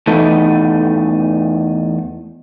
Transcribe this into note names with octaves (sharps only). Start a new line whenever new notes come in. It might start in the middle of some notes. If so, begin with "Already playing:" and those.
E2 A3 D#4 A4 B4